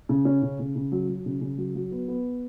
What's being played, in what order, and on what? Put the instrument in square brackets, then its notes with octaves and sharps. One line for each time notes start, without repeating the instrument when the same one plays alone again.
[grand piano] C#3
C#4
C#3
C#3
C#3
F#3
F#3
C#3
C#3
F#3
F#3
B3
B3